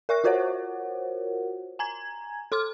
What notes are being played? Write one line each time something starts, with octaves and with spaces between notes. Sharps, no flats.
A#4 E5 C#6 F#6 A#6
F4 F#4 A#4 C5 C#5 F#5
G#5 A#5 G#6
A4 C6 D6 F6